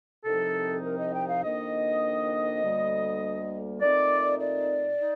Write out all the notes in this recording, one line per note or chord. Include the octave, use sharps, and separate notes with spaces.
C2 C3 F3 C4 D#4 A4
A#4
D#5
G5
F5
F2 D#3 A#3 D4 D#5
D2 D3 G3 A#3
A#2 A3 C4 D#4 D5
D5
D#4